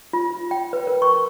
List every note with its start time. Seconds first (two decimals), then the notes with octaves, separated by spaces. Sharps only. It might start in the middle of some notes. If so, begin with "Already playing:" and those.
0.13 F4
0.51 G5
0.73 B4
0.87 A#4
1.02 C#6